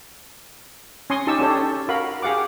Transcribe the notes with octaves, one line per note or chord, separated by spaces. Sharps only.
C#4 G#5 C6 C#6 D#6
D#4 G4 A5 C#6 E6
C#4 D4 G4 A4 C#5
F#4 A#4 F5 B5
G4 G#4 F5 F#5 D6